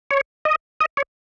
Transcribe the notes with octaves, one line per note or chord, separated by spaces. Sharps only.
C#5
D#5
D#5
C#5